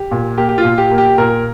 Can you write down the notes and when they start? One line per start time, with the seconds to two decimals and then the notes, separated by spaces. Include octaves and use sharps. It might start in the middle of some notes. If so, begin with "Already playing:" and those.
Already playing: G4
0.11 A#2
0.38 A#3 G4
0.49 G4
0.58 F4
0.64 A#2
0.78 G4
0.91 A#3
0.98 G4
1.18 A#2 A#4